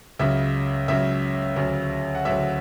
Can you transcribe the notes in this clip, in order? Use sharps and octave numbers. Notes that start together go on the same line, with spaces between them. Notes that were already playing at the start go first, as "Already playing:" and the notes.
C#2 C#3 F#3 E5
C#2 C#3 F#3 E5
D2 C#3 F#3
F#5
D2 C#3 F#3 E5